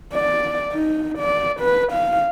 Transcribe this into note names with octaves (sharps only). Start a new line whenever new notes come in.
D5
D#4
D5
B4
F5